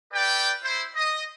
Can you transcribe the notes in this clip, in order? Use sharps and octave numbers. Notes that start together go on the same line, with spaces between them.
G4 A4 B4 D5 G5
E4 C5
D#5